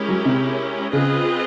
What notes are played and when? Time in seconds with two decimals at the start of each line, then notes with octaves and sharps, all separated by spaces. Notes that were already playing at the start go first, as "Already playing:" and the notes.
Already playing: G#3 C#4 E4 G4 A#4
0.09 F#3
0.25 C3
0.92 C#3 C4 F4 G#4 B4 D#5